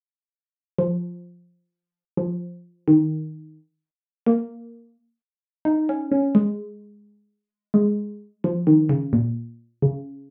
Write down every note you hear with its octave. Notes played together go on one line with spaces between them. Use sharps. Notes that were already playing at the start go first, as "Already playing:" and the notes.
F3
F3
D#3
A#3
D#4
C#4
C#4
G#3
G#3
F3
D#3
C#3
A#2
C#3